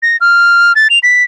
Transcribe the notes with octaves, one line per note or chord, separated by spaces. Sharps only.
A#6
F6
A6
F7
B6